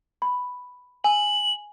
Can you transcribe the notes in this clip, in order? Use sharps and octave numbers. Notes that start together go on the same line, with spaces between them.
B5
G#5 F#7